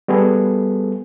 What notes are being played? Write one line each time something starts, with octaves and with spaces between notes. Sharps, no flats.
G3 B3 G#4 A4